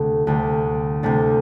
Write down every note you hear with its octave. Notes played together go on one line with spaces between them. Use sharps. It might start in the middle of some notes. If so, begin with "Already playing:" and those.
Already playing: D2 C3 A3 D4
D2 C3 A3 D4
D2 C3 A3 D4